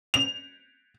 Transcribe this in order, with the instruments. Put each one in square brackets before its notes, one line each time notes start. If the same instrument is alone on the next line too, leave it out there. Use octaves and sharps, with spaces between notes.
[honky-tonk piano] F7